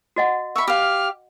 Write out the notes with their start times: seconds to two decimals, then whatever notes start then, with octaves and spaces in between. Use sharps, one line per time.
0.16 F#4 D#5 F#5
0.56 E5 B5 C#6
0.68 G4 F5 F6